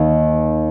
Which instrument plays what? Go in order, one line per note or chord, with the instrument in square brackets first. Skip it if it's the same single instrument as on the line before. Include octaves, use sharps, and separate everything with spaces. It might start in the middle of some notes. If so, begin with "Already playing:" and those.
Already playing: [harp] D#2 D#3 A#3